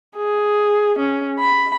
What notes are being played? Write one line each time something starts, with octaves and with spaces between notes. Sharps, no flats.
G#4
C#4
B5